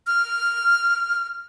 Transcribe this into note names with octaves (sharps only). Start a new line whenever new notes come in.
F6